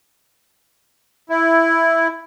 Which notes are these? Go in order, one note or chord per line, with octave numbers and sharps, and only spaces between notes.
E4